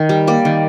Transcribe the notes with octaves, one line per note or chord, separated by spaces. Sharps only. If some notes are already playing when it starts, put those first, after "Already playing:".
Already playing: D#3
G3
A#3 D5
D#3